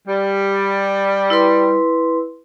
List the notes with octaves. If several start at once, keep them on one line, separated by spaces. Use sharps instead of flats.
G3
E4 B4 C6